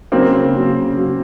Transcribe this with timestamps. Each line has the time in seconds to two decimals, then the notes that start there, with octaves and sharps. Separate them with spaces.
0.12 C#3 F#3 A#3 C4
0.54 C#3 F#3
0.95 C#3 F#3